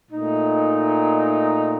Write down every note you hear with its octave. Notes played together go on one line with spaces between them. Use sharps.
A#2 A3 D#4